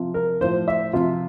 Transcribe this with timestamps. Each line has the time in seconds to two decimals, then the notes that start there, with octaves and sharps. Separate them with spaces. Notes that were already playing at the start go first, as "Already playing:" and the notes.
Already playing: C3 F3
0.14 A#4
0.41 A2 F3 C5
0.68 E5
0.93 C3 F3 F4